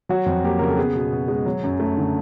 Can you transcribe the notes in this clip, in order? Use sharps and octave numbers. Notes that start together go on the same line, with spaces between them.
F#3 F#4
F2
A#3 G4
C#3 A#4
A4
B3 G#4
B2
B2
G#3
F#3
F#2
A3
D3